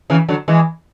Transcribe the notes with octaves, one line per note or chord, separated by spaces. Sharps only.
C#3 E3
D3 F#3
E3 G#3